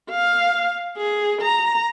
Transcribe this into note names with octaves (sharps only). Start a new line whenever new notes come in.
F5
G#4
A#5